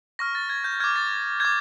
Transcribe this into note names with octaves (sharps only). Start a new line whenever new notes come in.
C#6 F6 A#6
A6
G#6
G6
D6 F6 G#6
A6
D6 G6 G#6